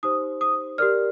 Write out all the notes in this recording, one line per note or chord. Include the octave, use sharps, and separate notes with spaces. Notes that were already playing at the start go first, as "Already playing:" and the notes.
D#4 G4 C5 D#6
D#6
G4 A#4 D5 F6